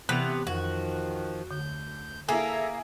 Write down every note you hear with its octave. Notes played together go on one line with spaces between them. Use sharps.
C3 E3 B3 E4 F#6 F7
F2 D#3 F3 F#4
D2 D3 G6
A#3 E4 G#4 A4 E5 G#5 A#5